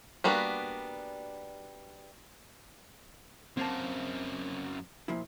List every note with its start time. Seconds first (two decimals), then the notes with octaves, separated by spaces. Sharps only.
0.24 G3 A#3 B3 D4 F#4
3.57 F#2 A#3 C4 C5 A5
5.08 A#2 F3 E4